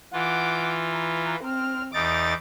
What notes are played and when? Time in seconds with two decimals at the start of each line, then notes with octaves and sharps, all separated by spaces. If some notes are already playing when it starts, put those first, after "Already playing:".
0.13 E3 F4 F#5 D6
0.93 B4 A#5
1.43 C4 F6
1.94 E2 D#4 D6 A6